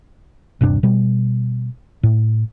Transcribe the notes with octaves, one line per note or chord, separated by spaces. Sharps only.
D#1 G2 C3 D4
B2 G3
A2